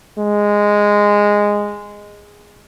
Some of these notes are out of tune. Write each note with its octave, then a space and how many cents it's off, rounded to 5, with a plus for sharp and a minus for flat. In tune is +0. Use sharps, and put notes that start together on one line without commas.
G#3 -10